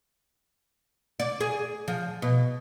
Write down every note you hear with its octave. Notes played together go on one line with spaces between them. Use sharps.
D5
G#4
F3
B2